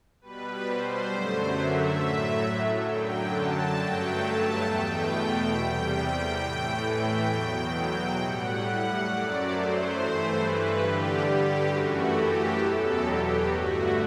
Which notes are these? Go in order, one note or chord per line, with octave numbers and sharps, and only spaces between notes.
B2 G3 B4
C5
F#2 D3 F#3 A3
E5
A2 F#3 A3
F#2 D3 F#3 G5
A5
G2 F#3 A3 G5
A5
E2 B2 A3 G5
E2 C3 G3
G5
A2 E3 A3
G5
E2 B2 F#3
A2 G3 F#5
F#5
F#2 F#3 A3 D5
C5
G2 E3 A3
B4
G2 D3 G3 G4
G4
F#2 E3 A3 F#4
G4
E2 B2 F#3 A4
G4
G2 D3 A3 F#4